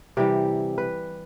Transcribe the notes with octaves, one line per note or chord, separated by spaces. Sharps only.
C3 E3 G3 G4
B4